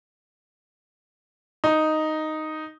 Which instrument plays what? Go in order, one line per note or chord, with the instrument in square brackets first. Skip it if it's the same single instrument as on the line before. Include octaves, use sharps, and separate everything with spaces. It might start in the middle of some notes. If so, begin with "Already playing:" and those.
[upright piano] D#4